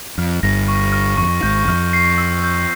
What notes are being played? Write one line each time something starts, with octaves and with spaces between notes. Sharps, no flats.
F2 F6
G1 G2 A#6
C#6
F6
F2 C#6
G#1 G#2 G6
F2 F6
C7
E6
G6